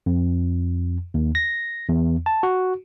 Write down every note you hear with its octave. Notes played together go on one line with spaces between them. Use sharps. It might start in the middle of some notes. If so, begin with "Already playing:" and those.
F2
D#2
A#6
E2
A5
F#4